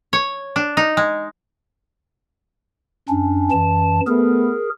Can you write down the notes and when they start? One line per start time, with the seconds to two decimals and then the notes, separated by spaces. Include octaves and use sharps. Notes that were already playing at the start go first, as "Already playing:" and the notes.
0.13 C#5
0.56 D4
0.77 D#4
0.97 G#3
3.09 F#2 C#4 D4
3.51 F#2 E3 A5
4.07 A3 B3 G#4 A#4